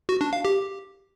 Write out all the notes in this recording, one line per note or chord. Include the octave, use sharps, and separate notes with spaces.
F#4
D4
F5
G4